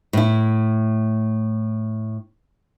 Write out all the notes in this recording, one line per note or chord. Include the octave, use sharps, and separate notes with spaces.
A2 E4